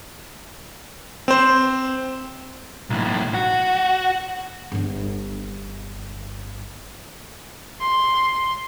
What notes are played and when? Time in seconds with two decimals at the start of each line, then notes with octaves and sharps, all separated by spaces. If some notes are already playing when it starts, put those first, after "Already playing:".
1.28 C4 C5
2.90 B1 A2
3.34 F#4
4.72 G1 D4
7.81 C6